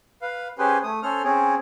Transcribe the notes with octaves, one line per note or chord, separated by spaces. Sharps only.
B4 F5
C#4 G4 G#4 B4 C5
A3 D#6
C#4 A4 C5 F6
C4 C#4 G#4